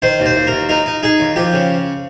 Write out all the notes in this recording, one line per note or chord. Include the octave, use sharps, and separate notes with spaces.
D#3 C5
D#2
C5
D#2
A#4
D#2
D#4 A#4
D#4
D#4 G#4
D#2
F3 G4
C#3